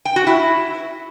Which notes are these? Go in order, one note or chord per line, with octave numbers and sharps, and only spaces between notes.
G5
F#4
E4